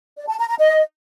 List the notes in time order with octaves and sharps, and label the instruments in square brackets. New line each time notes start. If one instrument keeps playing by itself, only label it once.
[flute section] D5
A5
A#5
A#5
D#5